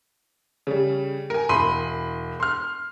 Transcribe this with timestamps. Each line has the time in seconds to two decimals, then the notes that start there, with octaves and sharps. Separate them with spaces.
0.67 C#3 G3
1.30 A#4 G#5
1.49 E1 B5 C6 D#7
2.40 C6 F6